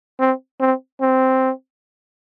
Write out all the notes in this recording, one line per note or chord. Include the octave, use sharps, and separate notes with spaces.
C4
C4
C4